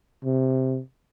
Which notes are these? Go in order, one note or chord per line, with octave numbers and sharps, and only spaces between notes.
C3